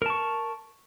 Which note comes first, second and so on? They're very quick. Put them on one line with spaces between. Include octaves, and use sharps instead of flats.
A#4 A5 C#6